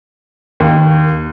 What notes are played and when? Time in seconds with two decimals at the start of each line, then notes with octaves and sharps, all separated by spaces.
0.60 D#2